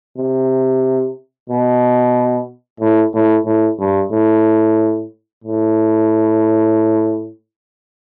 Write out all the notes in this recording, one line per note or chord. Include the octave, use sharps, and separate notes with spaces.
C3
B2
A2
A2
A2
G2
A2
A2